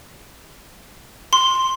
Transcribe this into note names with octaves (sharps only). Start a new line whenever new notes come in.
C6